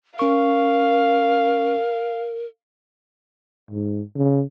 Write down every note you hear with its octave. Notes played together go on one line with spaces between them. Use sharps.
C#4 A#4 F5 C#6
G#2
C#3